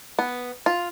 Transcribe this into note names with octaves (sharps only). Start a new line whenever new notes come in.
B3
F4